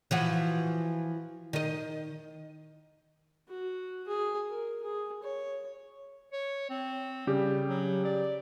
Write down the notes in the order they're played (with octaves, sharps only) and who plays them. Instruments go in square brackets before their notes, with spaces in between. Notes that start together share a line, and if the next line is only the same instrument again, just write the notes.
[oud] E3 F3 F#4
D#3 D#5
[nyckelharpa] F#4
G#4
A#4
G#4
C#5
[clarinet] C#5
C4
[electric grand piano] C#3 G4 [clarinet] G3
[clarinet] F#3
D5